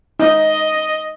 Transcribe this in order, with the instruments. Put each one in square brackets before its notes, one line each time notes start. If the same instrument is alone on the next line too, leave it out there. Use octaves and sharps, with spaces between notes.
[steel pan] D#4 [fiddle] D#5